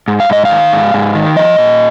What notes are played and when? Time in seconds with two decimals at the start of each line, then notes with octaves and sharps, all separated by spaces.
0.08 G#2
0.20 F5
0.29 G#2 D#5
0.45 F5
0.51 D#3
0.73 G#2
0.94 G#2
1.15 D#3
1.36 F3 D#5
1.58 A#2